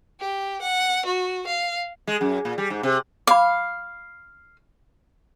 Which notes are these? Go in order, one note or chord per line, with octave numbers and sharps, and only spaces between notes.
G4
F#5
F#4
F5
G#3
F#2
A#2
G3
G#2
C3
F5 B5 D6